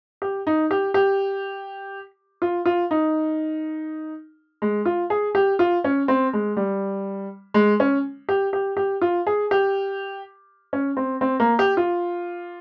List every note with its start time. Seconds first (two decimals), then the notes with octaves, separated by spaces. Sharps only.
0.22 G4
0.47 D#4
0.71 G4
0.94 G4
2.42 F4
2.66 F4
2.91 D#4
4.62 G#3
4.85 F4
5.10 G#4
5.35 G4
5.59 F4
5.84 C#4
6.08 C4
6.33 G#3
6.57 G3
7.54 G#3
7.80 C#4
8.29 G4
8.53 G4
8.77 G4
9.01 F4
9.27 G#4
9.51 G4
10.73 C#4
10.97 C4
11.21 C4
11.40 A#3
11.59 G4
11.77 F4